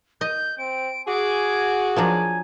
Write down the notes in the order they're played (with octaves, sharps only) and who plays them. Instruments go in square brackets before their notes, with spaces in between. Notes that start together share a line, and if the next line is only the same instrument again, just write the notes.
[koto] D#5 [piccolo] G6
[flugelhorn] C4 [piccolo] D7
[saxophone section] F#4 G#4 [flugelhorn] G#5 [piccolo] D6
[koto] F3 F#3 D4 [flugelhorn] G#5